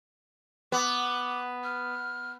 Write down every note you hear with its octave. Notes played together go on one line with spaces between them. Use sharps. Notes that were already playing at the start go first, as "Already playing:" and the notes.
B3 D6
F6